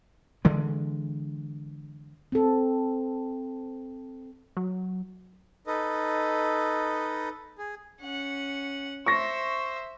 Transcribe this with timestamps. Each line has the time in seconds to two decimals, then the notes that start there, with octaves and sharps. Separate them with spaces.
0.45 D3 E3 G#3
2.32 C4 A4
4.57 F#3
5.67 D#4 A4 B4 D#5
7.58 G#4
8.01 C#4 F#5
9.06 C5 E5 C#6 A#6